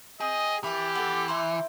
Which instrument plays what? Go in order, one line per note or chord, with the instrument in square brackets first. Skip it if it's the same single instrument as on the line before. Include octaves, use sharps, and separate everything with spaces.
[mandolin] C4 [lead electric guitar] G#4 [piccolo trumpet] D#5
[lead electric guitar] E3 [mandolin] E4 A#4 A5 [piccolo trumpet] G4
[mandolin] B3 A4
E4 A#4 C5